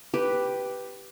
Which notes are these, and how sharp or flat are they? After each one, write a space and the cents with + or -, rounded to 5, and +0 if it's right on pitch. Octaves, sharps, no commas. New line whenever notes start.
G4 +0 B4 +0